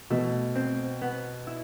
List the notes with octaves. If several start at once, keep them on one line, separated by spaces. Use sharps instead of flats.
B2 A3
C4
B3
E4